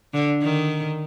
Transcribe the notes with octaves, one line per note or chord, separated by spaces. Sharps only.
D3
D#3